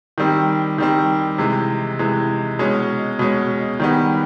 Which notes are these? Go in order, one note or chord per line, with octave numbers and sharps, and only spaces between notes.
D#3 G3 C4
D#3 G3 C4
C3 E3 G#3
C3 E3 G#3
B2 G#3 C#4
B2 G#3 C#4
D#3 G3 B3